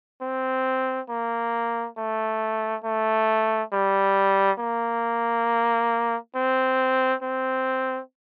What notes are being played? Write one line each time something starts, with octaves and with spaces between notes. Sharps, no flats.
C4
A#3
A3
A3
G3
A#3
C4
C4